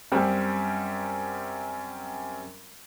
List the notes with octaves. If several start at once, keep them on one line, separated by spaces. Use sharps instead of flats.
F#2 G3 C4